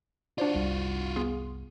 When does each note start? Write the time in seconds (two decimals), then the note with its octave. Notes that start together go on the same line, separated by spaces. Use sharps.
0.38 D4 F4 F#4 C5 D5
0.54 F#1 C2 G3
1.16 B3 G#4 C6